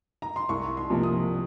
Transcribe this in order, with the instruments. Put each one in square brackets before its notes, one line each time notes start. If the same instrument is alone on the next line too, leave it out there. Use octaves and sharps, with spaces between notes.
[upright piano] A#5
C6
C2 C#6
C6
C3 F3 A#3
D#6